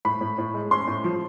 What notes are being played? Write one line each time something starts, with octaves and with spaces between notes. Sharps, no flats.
A2 B5
A2
A2
G#3
C#4 C6
A2
F3